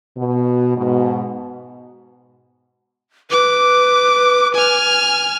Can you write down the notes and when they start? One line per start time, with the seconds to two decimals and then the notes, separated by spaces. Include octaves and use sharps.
0.17 B2
0.77 G#2 B2
3.31 B4 D6
4.54 G#5 F6